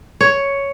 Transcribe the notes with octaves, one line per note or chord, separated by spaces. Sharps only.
C#5